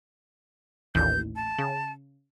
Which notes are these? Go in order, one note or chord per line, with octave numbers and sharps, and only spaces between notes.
A1 D#2 A#2 G6
A5
C#3